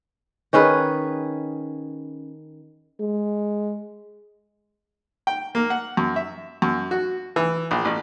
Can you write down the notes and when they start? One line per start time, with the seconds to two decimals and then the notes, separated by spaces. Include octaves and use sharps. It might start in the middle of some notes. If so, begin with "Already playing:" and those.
0.53 D#3 C#4 G#4 B4
3.00 G#3
5.27 G5
5.55 A#3
5.70 F#5
5.97 F#2
6.16 E5
6.62 F#2
6.91 F#4
7.36 E3
7.71 A#1
7.85 A1